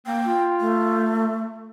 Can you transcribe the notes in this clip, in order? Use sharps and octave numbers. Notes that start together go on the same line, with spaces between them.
A#3 G5
F4
A3